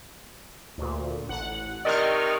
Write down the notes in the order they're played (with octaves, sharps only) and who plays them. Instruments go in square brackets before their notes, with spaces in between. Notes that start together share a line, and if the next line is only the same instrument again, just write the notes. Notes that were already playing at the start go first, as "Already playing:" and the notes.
[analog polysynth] D2 A#2
A1 F#5
[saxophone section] C3 D#3 D5 [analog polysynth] D#5 C#6 F6